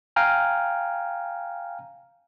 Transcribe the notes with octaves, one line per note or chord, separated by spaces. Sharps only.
F5 G5 G#5 A#5 F6